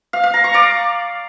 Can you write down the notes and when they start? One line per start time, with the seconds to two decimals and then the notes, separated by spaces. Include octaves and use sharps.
0.13 F5
0.23 F5
0.34 A#5
0.44 C#6
0.54 D5